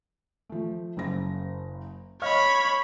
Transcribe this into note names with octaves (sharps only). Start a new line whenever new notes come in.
F3 A3
F#1 C#3 A#6
C#5 D#5 F5 B5 F6